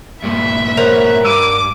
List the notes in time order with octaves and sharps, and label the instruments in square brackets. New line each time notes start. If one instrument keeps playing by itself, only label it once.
[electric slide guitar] G2 A#2 [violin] B4 E5
[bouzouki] A#4 C#5 F#5 [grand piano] C5
[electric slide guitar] G2 [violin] D6 [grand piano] E6 D#7